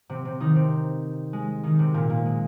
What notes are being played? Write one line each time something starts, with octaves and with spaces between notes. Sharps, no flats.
C3 C4
C3 C4
D#3 D#4
C3 C4
G#3
D#3 D#4
C3 C4
A#2 A#3
A#2 A#3
G#3